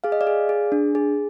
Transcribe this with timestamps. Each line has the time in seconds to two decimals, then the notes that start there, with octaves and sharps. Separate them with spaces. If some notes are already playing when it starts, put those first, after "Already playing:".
0.04 G#4 F5
0.12 D#5
0.21 D5 F5
0.27 G#4
0.49 G#4
0.72 D4
0.95 G#4